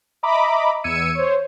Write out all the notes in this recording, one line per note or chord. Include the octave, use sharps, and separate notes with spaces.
D#5 E5 A#5 B5 D6
E2 E6 G#6 C#7 D#7
C5 C#5